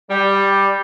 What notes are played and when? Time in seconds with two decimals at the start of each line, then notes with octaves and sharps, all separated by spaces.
0.10 G3